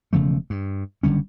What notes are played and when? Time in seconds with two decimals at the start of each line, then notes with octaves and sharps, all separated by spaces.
0.13 E1 C#3 F3 A3
0.50 G2
1.03 F#1 D3 G3 C#4